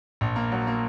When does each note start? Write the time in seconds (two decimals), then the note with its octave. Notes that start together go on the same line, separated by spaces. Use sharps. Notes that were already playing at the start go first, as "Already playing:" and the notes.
0.21 A#1
0.36 A#3
0.52 F#3
0.67 A#3